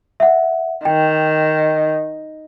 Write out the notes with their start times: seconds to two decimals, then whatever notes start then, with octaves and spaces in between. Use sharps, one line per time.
0.20 E5 F#5
0.85 D#3 G5